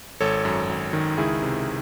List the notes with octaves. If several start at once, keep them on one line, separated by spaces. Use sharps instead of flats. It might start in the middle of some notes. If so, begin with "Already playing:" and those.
G#1 A4 C#5
F#2
G#1
D#3
C#2 E4 G#4
C3